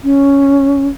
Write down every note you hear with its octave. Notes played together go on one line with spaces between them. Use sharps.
C#4